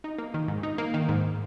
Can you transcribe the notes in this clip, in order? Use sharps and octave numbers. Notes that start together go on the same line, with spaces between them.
D#4
A#3
D#3
G#2
D#4
A#3
D#3
G#2